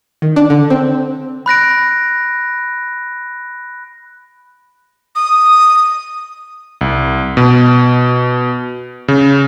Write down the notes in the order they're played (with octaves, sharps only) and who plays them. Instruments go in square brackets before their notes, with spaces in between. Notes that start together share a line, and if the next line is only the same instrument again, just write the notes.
[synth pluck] D#3
D4
D3
C4
[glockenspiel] B5 F#6 A#6 D7
[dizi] D#6
[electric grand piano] C2
B2
C#3